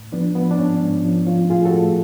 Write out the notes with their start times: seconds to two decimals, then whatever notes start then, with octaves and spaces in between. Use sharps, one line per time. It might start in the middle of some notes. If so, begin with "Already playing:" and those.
Already playing: A2
0.12 F3 B3 D4
0.35 F3 B3
0.51 D4
0.58 G#2 C#4
0.82 G#2
1.04 F3
1.27 F3 C#4 F4
1.50 A2 F4 G#4
1.65 F#4 A4
1.73 A2